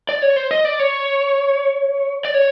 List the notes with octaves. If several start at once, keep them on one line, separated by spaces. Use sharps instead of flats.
D5
C#5
C5
D#5
D5
C#5
D5
C#5